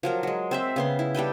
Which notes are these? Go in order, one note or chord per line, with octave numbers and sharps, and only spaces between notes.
F3 F#3 A#4
F#3 G#3
C4 C5 E5
C#3 B3 C6
E4
G3 A4 B4 G5